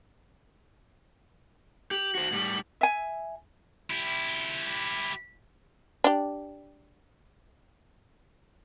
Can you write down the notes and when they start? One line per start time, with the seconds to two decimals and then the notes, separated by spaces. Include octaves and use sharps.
1.91 G4 F#7
2.15 F#4 C5
2.32 A2 G3
2.81 E5 G#5
3.90 E4 G4
6.04 D4 G4